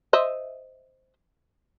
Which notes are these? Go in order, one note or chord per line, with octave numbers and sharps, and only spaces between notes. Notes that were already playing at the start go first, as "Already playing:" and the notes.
C5 D#5 E5